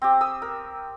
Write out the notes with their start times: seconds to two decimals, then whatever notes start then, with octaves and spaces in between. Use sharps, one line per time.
0.02 C4 G4
0.21 D#6 E6
0.42 A#4